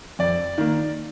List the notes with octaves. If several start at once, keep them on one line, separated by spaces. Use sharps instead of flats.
F2 D5
D#3 A#3